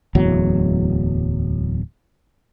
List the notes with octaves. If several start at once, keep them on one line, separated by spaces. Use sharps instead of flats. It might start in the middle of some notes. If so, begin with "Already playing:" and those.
D1 E2 F#3